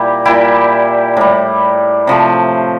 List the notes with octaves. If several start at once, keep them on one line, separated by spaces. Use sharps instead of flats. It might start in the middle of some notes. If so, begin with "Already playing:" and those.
Already playing: A#2 G3 E4 G4
A#2 G3 E4 G4
A2 G3
C3 F3 A3